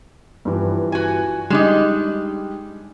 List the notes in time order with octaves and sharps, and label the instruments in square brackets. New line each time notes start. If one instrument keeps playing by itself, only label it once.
[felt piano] G2 E3 F3
[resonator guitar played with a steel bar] F#4 G#5
[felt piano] G3 [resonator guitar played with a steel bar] G#3 D4 D#4